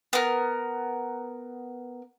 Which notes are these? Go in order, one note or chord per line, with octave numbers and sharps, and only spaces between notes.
B3 A#4